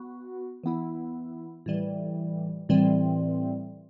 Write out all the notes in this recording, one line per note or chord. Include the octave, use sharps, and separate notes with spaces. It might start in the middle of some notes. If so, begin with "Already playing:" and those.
Already playing: B3 F#4
E3 B3 E4
A2 E3 G3
A2 E3 G3 C4